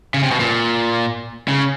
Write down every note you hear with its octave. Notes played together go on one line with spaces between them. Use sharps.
C#3
C3
B2
A#2
C#3